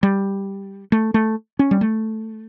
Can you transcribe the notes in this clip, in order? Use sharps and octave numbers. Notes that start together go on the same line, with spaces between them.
G3
A3
A3
C#4
G3
A3